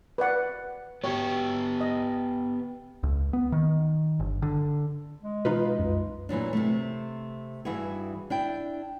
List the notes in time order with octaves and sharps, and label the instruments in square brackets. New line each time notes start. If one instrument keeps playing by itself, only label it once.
[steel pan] B4 D5 F#5
[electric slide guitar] B3 G4 [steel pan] C#5
[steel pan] D#5
[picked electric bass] C#2
B3
D#3
G1
D3
[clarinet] G#3
[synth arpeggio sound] B2 E3 [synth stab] D#4 F4 B4
[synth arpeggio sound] C2 F#2
[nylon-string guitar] A#2 E3 F#3 D4
C3 A3
G2 E3 E4 F#4 G#4
D4 E4 G5